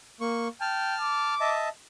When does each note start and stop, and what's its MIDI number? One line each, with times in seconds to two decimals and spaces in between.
0.21 0.48 58
0.21 0.48 85
0.61 0.95 79
0.61 1.35 81
0.61 1.35 89
1.01 1.55 86
1.40 1.69 75
1.40 1.69 76
1.40 1.69 81